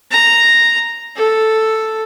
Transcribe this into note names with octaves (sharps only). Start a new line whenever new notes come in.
A#5
A4